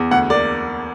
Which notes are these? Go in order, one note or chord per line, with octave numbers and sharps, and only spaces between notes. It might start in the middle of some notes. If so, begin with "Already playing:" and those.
Already playing: E2
D2 F#5
A#3 D5